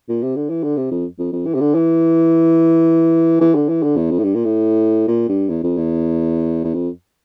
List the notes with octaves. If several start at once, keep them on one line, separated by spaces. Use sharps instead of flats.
A#2
C3
D3
E3
D3
C3
F2
F2
F2
E3
C3
D3
E3
E3
D3
E3
D3
E2
F2
A2
G2
A#2
A2
A#2
G2
E2
F2
E2
E2
F2